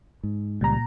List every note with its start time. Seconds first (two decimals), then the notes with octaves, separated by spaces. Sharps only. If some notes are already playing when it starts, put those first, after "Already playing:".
0.23 G#2
0.61 C#2 A#2 F3 G3 A#5